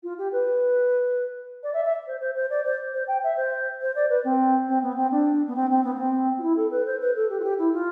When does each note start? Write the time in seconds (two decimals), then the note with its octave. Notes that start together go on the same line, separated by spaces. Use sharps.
0.03 F4
0.18 G4
0.32 B4
1.63 D5
1.74 E5
1.85 E5
2.07 C5
2.20 C5
2.36 C5
2.50 D5
2.65 C5
2.93 C5
3.08 G5
3.23 E5
3.37 C5
3.81 C5
3.95 D5
4.10 B4
4.24 C4
4.68 C4
4.83 B3
4.97 C4
5.11 D4
5.47 B3
5.56 C4
5.70 C4
5.84 B3
5.95 B3
5.99 C4
6.38 F4
6.43 E4
6.56 A4
6.71 B4
6.86 C5
7.01 B4
7.16 A4
7.29 G4
7.40 F4
7.44 G4
7.59 E4
7.73 F4